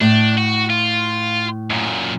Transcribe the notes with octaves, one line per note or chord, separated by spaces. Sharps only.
A2 D4
F#4
F4
F#2 A#2